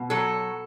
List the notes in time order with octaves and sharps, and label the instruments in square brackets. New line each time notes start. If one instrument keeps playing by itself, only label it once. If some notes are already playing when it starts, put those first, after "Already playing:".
Already playing: [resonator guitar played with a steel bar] B2
F#3 A4